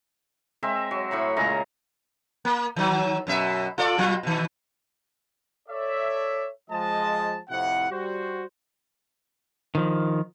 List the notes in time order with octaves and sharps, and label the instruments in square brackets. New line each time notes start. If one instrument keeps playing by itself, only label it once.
[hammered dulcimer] G#3 C4 A#4 E5
F#3
A2 A3 B5 C#6
A#2 C#3 G#3 A#5
[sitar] A#3
D#3 F#3
F#2 B2 E5
F4 A4 D5
B2 F#3 F4
B2 D#3
[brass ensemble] A4 C#5 D5 E5
F3 G#3 D#5 A5
F2 A2 C3 E4 F#5
G3 F#4 C5
[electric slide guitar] D#3 F3